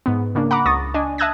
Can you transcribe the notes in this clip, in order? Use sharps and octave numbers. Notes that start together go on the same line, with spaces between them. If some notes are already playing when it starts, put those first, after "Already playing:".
G#2 B3
C#3 A#3 D4
F#5 A#5 B5 D6
C#2 C#6 D#6 A6 A#6
D4 D#5 G#5
E5 A5 D#6 F#6 G#6 A#6